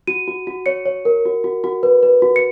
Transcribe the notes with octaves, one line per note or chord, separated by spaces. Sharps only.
F#4 D#7
F#4
F#4
C#5 C#7
C#5
A#4
F#4
F#4
F#4
B4
B4
F#4
C#7